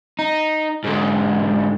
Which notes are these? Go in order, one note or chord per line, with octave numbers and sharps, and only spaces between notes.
D#4
G#2 D3